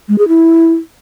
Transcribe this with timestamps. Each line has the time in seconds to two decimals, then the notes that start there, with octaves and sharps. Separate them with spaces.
0.08 G#3
0.18 G#4
0.28 E4